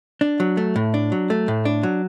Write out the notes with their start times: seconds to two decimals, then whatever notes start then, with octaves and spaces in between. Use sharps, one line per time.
0.21 D4
0.40 F#3
0.57 A3
0.76 A2
0.94 D4
1.12 F#3
1.30 A3
1.48 A2
1.65 D4
1.83 F#3